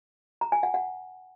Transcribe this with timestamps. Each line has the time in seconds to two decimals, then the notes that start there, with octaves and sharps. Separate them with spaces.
0.41 A#5
0.52 G#5
0.63 F#5
0.74 F#5